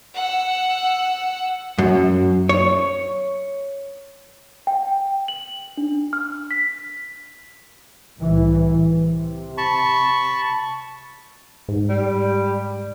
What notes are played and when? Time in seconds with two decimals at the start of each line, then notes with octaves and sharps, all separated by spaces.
0.16 F#5 E6
1.78 F#2
2.49 C#5
4.67 G5
5.28 F#7
5.77 D4
6.13 F6
6.51 B6
8.18 C2 A2 E3
8.91 C3
9.58 A5 B5 C#6
11.69 G#2
11.89 G3